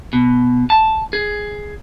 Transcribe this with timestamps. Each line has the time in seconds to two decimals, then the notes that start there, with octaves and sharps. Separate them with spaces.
0.13 B2
0.70 A5
1.13 G#4